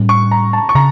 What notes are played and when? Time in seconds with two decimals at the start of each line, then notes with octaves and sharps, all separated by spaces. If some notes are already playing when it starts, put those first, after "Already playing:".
Already playing: A2 G3 C#4
0.09 C#6
0.31 A#5
0.53 A5
0.69 C#6
0.75 C#3 A#5